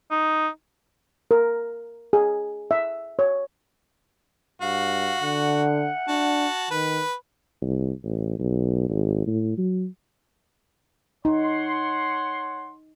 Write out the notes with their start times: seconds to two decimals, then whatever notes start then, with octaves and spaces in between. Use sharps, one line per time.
0.11 D#4
1.31 A#4
2.13 G#4
2.71 E5
3.19 C#5
4.61 G2 F#4 F5
5.22 D3 F#5
6.08 D4 F#4 A5
6.71 D#3 B4
7.62 C2
8.04 A1
8.39 B1
8.89 G#1
9.27 A2
9.58 F#3
11.25 D#4 C#5 F#5 C6